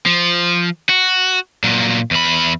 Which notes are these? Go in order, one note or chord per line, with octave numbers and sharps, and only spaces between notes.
F3
F#4
A#2 F#3
E2 B5